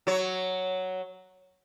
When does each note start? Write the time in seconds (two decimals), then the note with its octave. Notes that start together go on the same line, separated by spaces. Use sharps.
0.07 F#3 C#5